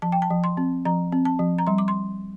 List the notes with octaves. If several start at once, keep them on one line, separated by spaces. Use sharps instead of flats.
F3 A5
G5
A5
F3
C6
C4
F3 A#5
C4
A5
F3
A#5
G3 C6
D6
C6